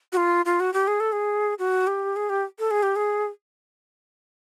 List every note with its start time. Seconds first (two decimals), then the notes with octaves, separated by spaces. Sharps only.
0.12 F#4
0.17 F4
0.45 F4
0.60 F#4
0.74 G4
0.87 G#4
1.00 A4
1.12 G#4
1.59 F#4
1.87 G4
2.16 G#4
2.30 G4
2.59 A4
2.71 G#4
2.83 G4
2.96 G#4